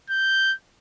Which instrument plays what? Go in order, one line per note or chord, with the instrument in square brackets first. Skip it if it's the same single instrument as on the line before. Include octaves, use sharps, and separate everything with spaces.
[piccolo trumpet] G6